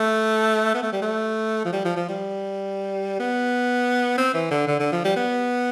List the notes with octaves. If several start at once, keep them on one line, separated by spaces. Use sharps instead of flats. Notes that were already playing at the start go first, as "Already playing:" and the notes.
Already playing: A3
B3
A3
G3
A3
F3
G3
F3
F3
G3
B3
C4
E3
D3
D3
D3
F3
G3
B3